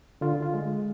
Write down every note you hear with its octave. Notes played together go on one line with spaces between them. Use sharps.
D3 F4
F4
G#3